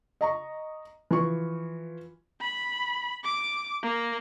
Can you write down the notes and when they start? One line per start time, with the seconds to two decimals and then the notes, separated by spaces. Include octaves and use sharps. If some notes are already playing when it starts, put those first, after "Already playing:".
0.21 D#5 A#5 C#6
1.11 E3 F3 F4 C#6
2.41 B5
3.24 D6
3.82 A#3